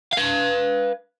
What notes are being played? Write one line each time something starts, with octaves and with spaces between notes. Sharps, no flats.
B4 F5